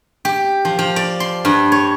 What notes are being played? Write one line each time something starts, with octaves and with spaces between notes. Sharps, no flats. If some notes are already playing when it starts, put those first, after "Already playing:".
G4
F3
F3
D5
C6
G2
C#5